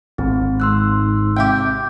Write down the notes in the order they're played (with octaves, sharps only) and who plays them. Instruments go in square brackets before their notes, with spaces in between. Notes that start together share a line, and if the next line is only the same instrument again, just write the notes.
[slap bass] G#1 [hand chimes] C4
[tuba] G#2 [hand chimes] C6 E6 F#6
[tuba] C3 [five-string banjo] G4 E5 G5 [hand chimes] G6